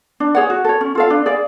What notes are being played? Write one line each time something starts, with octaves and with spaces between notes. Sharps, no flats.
D4
G#4 C#5 F#5
F#4
A4 C#5
C#4
F4 A4 F5
D4
G#4 D5 F5